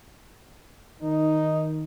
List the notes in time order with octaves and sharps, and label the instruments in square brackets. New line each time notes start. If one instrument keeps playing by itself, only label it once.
[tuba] D#3 [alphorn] D#4